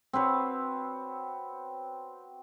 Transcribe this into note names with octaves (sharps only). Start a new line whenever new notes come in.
C4 F#4 B4 C#5